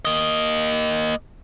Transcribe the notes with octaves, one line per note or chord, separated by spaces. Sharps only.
A#3 D#5